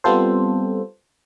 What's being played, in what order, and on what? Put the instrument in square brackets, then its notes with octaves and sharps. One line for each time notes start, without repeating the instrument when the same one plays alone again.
[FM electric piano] G3 B3 C4 F4 A4 C5